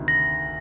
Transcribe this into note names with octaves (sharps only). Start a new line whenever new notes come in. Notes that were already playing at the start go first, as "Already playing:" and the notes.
Already playing: D2 C3 D#3
A#6